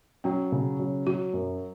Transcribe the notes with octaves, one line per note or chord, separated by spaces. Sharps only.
F#3 C#4
C#3
F#3
F#3 F#4
F#2